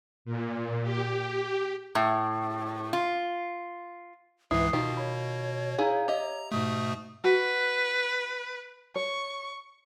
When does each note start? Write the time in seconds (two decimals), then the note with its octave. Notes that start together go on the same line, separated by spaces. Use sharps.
0.25 A#2
0.82 G4
1.95 A2
2.93 F4
4.51 C#2 G#2 E3 E4 B4 D#6 C7
4.73 B2 D#3 D#4 F4 G4
4.97 C#5 B5
5.78 D#4 E4 G#4 F5 A#5
6.08 G4 D#5 E5 A#5
6.52 G#2 B2 A3 D#6
7.24 F#4 B4
8.96 C#5 C#6